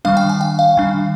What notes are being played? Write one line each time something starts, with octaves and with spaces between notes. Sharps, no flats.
D#3 G3 D4 F5
G5
G#5
G5
F5
D#3 G3 D4